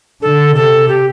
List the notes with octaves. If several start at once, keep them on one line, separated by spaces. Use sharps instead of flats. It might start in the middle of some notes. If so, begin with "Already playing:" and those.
D3 A4
C3 A4
G4